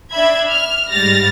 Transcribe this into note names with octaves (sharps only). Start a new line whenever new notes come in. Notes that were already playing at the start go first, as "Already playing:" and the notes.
D4 E5 B5 G#6
F6
G#2 G3 F6 A6 A#6